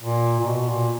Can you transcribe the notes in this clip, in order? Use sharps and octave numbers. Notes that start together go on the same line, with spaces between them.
A#2
A#2
B2
A#2